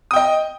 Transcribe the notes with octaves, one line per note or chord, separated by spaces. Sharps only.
D#5 G5 D#6